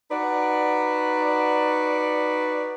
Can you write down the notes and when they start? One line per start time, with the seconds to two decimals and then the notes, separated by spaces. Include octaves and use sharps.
0.11 D#4 F#4 B4 D5